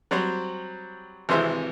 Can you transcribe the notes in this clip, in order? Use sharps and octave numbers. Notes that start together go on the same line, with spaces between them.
F#3 G3 C4 C5 C#5
G#1 C3 E3 G#3 C5 E5